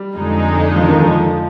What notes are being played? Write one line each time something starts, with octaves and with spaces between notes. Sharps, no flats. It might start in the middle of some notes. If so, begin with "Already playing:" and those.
Already playing: G3
F2 D3 G#3 D#4
F3
D#3
F3